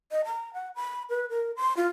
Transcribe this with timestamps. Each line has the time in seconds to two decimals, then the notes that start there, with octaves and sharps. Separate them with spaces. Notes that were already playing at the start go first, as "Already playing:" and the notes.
0.11 D#5
0.25 A#5
0.54 F#5
0.76 B5
1.10 B4
1.30 A#4
1.56 C6
1.77 F4